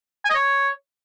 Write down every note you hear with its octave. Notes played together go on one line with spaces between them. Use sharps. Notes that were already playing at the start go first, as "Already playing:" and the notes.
G#5
D#5
C#5